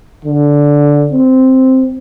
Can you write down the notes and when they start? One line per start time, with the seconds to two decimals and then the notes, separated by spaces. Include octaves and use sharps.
0.25 D3
1.12 C4